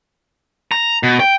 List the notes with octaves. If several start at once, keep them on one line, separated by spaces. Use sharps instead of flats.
A#5
B2
G5